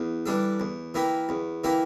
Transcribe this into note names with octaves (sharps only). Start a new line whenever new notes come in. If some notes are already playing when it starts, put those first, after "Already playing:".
Already playing: E2
E3 G3 D4 A4
E2
E3 A#3 E4 G4
E2
E3 A#3 E4 G4